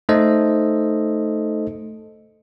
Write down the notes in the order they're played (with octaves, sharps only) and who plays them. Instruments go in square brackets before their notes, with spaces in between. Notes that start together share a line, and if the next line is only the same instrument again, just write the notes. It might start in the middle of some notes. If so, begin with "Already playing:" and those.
[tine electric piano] A3 D#4 A4 C5 D#5